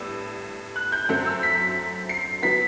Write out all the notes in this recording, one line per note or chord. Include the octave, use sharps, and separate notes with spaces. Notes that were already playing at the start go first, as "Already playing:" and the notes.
Already playing: A2 G3 B3 E6
F#6
G6
F#2 F#3 A3 C4
E6
B6
C7
F#3 B3 B6